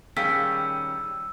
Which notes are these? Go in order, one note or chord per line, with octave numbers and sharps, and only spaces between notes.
D#3 G3 C#4 G#4 F5 G5 E6 B6